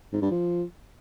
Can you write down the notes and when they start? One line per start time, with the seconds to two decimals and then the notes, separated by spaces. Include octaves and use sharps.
0.13 G#2
0.22 G2
0.31 F3